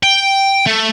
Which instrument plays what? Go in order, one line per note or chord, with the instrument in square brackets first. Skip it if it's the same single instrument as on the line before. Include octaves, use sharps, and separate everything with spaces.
[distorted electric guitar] G5
A3